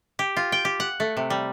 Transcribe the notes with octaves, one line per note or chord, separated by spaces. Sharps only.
G4
F4
G5
G4
F#5
A3
C3
G3